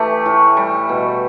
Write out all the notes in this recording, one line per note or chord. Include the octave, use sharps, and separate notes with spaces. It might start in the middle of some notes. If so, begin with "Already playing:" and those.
Already playing: E3 A3 G4
A2
G3
B2